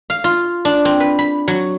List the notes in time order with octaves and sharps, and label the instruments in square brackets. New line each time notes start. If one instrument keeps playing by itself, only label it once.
[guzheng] F5
F4
D4
C4
B4
B5
F#3